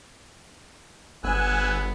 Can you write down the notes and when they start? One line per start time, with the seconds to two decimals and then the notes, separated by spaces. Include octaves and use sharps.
1.24 G1 B3 G#5 E6 F#6